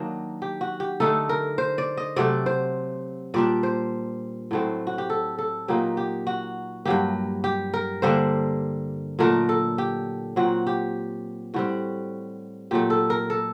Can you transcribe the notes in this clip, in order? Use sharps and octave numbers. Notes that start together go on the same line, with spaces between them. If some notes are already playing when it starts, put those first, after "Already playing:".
Already playing: D#3 F#3 A#3 D4
G4
F#4
G4
D3 A3 D#4 A4
A#4
C5
D5
D#5
C3 F#3 A3 D5
C5
A#2 G3 D4 D5
C5
A2 F#3 A3 C4
F#4
G4
A4
A4
A#2 F#3 A#3 D#4 G4
G4
F#4
G2 F#3 A#3 G4
G4
A#4
D3 G3 A#3 D4 C5
A#2 F#3 A3 D4 A#4
A4
G4
A#2 F#3 C4 F#4
G4
A2 G3 C4 F#4
A#2 F#3 A3 G4
A4
A#4
A4